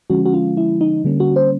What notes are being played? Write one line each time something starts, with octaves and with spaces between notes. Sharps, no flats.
D3 F3 G#3 C#4 F#4
F#4
F4
E4
D#4
D3 G3 A#3 C#4
F#4
C5